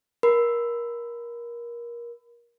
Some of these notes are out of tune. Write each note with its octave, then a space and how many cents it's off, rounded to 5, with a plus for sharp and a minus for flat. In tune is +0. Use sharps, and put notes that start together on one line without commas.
A#4 +20 B5 +30